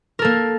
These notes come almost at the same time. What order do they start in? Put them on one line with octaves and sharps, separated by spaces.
A#4 A4 A#3